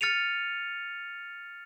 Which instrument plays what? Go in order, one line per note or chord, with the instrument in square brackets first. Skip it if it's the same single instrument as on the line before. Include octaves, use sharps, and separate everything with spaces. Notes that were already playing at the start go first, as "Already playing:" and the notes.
[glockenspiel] F6 A6 C#7 D#7 F7